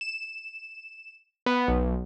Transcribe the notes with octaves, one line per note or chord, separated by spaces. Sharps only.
E7
B3
B1